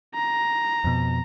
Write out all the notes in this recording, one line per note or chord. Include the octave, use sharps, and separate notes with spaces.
A#5
F2 B2